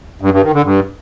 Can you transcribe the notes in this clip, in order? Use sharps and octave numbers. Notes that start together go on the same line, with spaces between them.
G2
G2
D#3
D3
G2